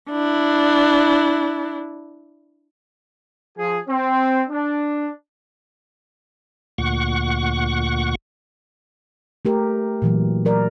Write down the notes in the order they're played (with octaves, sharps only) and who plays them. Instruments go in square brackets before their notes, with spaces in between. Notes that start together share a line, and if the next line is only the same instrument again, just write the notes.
[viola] D4 E4
[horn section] F3 G#4
C4
D4
[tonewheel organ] D2 A#2 F#5 C#6
[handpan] A3 G4 A#4
A#2 E3 F#3
F#3 A#4 D5